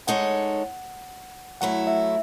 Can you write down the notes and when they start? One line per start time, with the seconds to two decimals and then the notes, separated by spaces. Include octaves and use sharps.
0.07 G#3 D#4 A4 C#5 F#5
1.61 F#3 A3 E4 F#5
1.87 E5